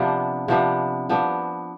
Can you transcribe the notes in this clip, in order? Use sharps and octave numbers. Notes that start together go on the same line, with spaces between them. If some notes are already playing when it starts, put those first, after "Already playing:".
Already playing: C3 F3 B3 D4
C3 F3 B3 D4
F3 B3 D4